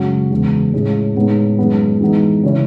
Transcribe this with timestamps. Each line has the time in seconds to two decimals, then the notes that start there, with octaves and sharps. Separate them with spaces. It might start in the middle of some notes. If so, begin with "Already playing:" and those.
Already playing: F#2 C#3 G#3 C#4 F#4
0.31 E2 C#3 G#3
0.74 A2 G#3 C#4
1.16 A2 G#3 B3 D#4
1.58 F#2 D#3 G#3 B3
2.01 E3 G#3 B3 D#4
2.43 C#3 E3 A3 C#4 E4